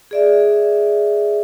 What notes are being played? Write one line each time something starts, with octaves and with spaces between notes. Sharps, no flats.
G#4 D5 E5